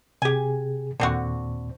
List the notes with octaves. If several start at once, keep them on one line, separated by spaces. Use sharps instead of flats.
C3 G4 G#4 G#5
D#2 A#2 D3 C4 F#4